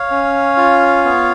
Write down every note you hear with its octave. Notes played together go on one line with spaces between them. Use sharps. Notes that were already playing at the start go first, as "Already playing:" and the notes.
Already playing: C#5 F5
C#4
F4
B3